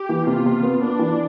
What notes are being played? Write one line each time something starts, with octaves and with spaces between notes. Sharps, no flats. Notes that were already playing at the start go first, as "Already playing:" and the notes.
Already playing: G4
E3
C3 F4
C3
B3
B3 D4
E3